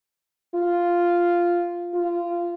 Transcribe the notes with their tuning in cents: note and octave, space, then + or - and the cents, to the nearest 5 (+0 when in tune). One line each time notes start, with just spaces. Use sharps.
F4 -5
F4 -20